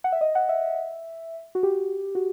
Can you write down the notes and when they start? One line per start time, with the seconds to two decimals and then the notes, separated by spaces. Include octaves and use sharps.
0.04 F#5
0.12 E5
0.21 D#5
0.35 F#5
0.49 E5
1.55 F#4
1.63 G4
2.15 F#4